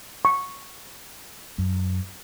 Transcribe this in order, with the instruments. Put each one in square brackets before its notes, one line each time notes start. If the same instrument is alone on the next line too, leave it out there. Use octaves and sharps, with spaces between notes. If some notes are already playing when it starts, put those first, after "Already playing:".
[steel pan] C#6
[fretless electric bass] F#2